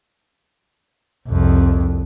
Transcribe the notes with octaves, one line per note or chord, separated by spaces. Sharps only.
C2 F2